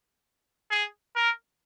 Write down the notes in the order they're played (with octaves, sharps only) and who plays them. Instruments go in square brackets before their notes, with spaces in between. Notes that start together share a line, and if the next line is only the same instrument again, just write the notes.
[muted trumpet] G#4
A#4